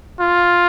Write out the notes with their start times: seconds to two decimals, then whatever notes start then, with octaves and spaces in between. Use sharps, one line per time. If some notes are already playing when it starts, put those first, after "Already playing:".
0.20 F4